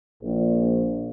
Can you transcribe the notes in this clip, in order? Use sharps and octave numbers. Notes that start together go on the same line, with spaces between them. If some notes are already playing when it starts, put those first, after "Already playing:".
A#1